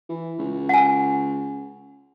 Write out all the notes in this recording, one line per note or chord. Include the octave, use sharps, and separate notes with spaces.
E3
C#2
F#5 G#5